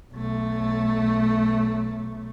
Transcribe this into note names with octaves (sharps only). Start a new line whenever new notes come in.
B1 A3